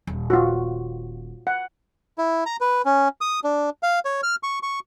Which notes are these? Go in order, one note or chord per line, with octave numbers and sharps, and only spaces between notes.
D#1
F4 F#4
F#5
E4
A#5
B4
C#4
D#6
D4
F5
C#5
F6
C#6
C#6